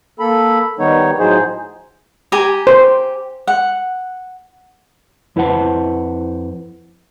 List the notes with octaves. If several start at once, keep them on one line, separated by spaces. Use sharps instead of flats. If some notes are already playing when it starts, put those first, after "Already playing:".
A#3 A4 B5
D#3 G3 B3 D#4 C#5
A2 F3 F#3 D#4 G#4 C5
G4 G#5 A#5
C5
F#5
F2 E4 B4 C5 F#5 A5